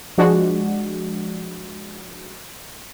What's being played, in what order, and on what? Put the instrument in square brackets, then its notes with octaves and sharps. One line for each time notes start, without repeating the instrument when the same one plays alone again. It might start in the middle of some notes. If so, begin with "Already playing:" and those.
[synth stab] F3 G#3 D4 F#4